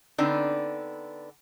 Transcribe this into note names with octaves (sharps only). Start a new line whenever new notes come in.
D3 B3 C4 D4 D#4